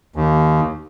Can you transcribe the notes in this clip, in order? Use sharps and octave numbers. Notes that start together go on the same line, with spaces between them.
D#2